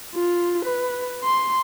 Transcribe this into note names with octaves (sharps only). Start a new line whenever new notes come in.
F4
B4
C6